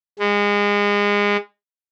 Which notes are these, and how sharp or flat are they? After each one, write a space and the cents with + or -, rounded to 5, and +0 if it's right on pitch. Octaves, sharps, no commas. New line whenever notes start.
G#3 -25